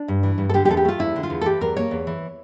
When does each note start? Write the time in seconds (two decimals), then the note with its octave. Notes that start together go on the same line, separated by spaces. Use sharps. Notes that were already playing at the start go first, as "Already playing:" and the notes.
Already playing: D4
0.08 G2
0.23 E3
0.38 G2
0.49 A4
0.54 D3 G4
0.65 G4
0.69 E2 A4
0.77 G4
0.85 A3 F4
0.99 E2 E4
1.16 D3
1.23 F4
1.30 E2
1.41 A4
1.46 E3 G4
1.61 E2 A#4
1.76 A#3 C#5
1.91 E2
2.07 E3